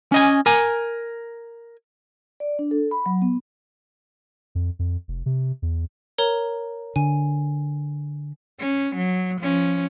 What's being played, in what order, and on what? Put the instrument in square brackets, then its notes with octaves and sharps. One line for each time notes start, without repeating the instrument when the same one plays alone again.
[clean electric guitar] C#4 D#5 G#5
A#4 G#5
[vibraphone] D5
D4
A4
B5
F#3
B3
[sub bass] F2
F2
F1
C3
E2
[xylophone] A#4 C#5 A#5
[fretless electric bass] D3 [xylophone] G#5
[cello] C#4
F#3
F3 C#4